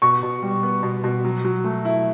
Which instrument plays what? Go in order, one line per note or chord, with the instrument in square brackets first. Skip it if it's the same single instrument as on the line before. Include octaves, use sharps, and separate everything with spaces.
[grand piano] B2 C#6
B2
G3
B3
B2
B2
F#3
F#3
A3
E4